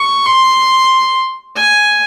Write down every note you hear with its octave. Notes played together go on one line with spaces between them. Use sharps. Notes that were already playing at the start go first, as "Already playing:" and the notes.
Already playing: C#6
C6
G#5